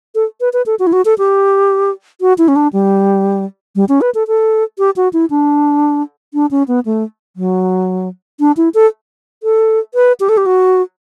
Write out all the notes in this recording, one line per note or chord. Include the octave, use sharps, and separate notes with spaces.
A4
B4
B4
A4
F#4
E4
F#4
A4
G4
F#4
E4
C#4
D4
G3
G3
C#4
B4
A4
A4
G4
F#4
E4
D4
D4
C#4
B3
A3
F#3
D4
E4
A4
A4
B4
G4
A4
G4
F#4